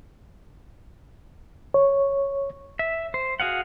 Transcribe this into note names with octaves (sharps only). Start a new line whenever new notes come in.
C#5
E5
C5
F#4 G#4 F5 F#5